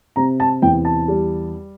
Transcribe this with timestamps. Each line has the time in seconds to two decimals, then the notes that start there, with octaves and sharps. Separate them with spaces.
0.16 C3 A#5
0.40 A5
0.62 E2 G5
0.85 A5
1.08 G3